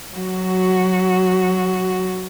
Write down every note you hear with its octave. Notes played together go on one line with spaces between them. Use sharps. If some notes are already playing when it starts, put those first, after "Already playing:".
F#3 F#4